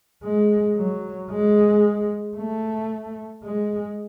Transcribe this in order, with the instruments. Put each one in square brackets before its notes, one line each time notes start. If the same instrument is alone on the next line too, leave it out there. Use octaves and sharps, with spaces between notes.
[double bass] G#3
F#3
G#3
A3
G#3